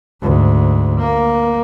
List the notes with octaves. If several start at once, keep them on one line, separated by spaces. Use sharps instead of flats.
D2 G#2
A#3